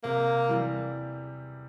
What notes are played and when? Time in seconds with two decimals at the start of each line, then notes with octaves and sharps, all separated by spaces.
0.03 C3 A#3
0.48 E3 G3